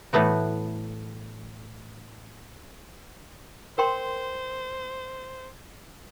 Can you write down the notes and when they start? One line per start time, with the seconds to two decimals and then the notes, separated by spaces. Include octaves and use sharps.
0.13 A2 E3 A3 B3 F#4
3.78 A#4 C5 G5 C6